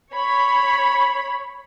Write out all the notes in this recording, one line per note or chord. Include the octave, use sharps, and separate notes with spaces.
C#5 B5